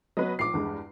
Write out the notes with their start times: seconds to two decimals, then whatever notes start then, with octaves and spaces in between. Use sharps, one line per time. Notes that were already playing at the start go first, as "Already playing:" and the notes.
0.17 F#3 B3 B4 D#5
0.39 A#1 D6 C7
0.53 E2 G2 G#3